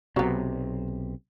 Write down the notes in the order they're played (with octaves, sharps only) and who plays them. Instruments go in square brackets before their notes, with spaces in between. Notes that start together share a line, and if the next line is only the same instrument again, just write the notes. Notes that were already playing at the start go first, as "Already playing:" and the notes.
[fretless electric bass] B1 C3 [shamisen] F#3 B3